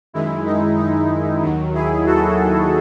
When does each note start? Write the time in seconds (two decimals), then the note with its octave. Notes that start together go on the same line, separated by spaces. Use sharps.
0.13 F#2 D#3 G#3 E4
0.45 D#4
0.78 D#4
1.42 D#2 D#3 F#3
1.74 E4 G#4
2.06 F#4 A4